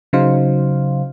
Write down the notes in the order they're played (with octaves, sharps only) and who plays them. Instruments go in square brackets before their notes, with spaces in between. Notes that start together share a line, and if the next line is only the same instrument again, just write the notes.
[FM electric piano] C#3 F#3 D#4 C5 F5